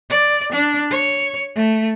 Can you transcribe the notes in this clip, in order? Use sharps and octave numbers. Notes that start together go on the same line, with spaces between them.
D5
D4
C#5
A3